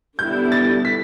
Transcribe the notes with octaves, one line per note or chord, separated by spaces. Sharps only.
D3 G3 B3 E4 G6
A6
B6